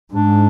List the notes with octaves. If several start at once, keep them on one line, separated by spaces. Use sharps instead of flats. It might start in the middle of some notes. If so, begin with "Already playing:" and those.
G#2 D4